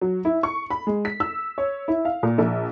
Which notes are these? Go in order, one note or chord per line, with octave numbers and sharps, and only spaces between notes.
F#3
E4
C#6
B5
G#3
B6
E6
C#5
E4
F5
A#2
A#1